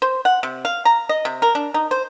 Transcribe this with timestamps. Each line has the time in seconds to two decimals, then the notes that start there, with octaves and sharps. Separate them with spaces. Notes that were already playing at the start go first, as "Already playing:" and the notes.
0.02 C5
0.25 F#5
0.43 C3
0.65 F5
0.85 A#5
1.09 D#5
1.25 C3
1.42 A#4
1.55 D4
1.74 D#4
1.91 C5